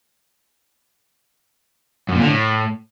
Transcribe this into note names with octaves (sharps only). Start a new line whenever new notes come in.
F#2
A#2
D3
A2